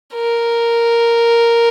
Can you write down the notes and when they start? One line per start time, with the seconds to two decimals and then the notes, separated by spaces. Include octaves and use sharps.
0.15 A#4